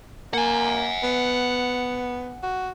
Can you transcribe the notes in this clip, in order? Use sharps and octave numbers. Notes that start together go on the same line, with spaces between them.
A#3 F#5 G#5
B3
F#4